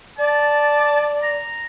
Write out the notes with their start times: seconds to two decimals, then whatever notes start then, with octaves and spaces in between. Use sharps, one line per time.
0.18 D5 A5
1.22 A#5